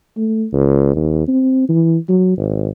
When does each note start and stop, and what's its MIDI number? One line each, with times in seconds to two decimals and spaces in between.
0.17 0.47 57
0.53 0.92 37
0.96 1.28 39
1.28 1.67 60
1.69 1.97 52
2.09 2.37 54
2.38 2.69 32